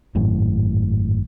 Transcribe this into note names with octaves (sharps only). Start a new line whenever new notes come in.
G#1 F#2 A2